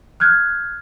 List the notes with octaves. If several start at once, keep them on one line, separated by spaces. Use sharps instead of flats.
F6 F#6 G#6